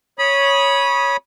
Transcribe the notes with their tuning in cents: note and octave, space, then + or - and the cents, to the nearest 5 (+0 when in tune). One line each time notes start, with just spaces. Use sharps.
C#5 +0 B5 -20 D#6 -5